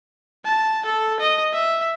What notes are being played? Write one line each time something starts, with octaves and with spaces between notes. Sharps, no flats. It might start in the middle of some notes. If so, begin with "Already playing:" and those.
A5
A4
D#5
E5